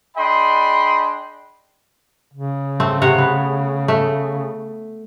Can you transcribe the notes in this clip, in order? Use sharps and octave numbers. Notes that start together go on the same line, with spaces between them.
D4 G#4 D#5 G5 B5 C6
C#3
A3 C4
C3 C#5 F#5
B3
A3